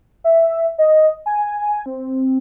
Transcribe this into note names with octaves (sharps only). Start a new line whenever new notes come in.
E5
D#5
G#5
C4